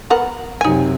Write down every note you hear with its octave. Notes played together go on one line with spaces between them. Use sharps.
B3 A#4 F#5
F#2 C3 F#3 D#4 G#5